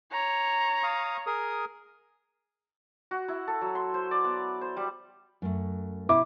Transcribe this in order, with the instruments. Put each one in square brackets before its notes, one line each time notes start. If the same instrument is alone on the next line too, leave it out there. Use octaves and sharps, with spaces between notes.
[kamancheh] C#5 A#5
[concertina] F5 D#6
G#4 A#4 D#6
[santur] F#4
E4
A4
F#3
C6
C5
D5
B3
C5
G3
[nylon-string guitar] F#2 A3
[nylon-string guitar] B2 [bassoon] E4 [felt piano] D6